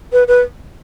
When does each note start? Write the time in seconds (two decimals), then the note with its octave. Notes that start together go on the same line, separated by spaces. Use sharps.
0.13 B4
0.28 B4